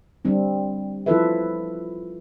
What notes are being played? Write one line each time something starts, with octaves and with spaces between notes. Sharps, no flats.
G3 C4 D4
F3 E4 F4 A4 B4 E5